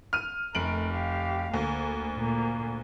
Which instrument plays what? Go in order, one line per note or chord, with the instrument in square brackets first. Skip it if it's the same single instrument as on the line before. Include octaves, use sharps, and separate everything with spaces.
[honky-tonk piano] F6 D#7
[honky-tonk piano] F1 D7 F#7 [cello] A3 A#4
[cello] G4 F5
[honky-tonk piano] D2 [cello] A#3
[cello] A#2 A#3